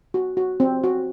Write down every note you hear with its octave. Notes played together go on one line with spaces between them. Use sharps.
F#4
F#4
C4
F#4